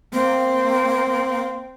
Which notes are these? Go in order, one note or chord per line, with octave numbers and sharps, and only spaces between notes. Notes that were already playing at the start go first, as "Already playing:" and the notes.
A#3 C4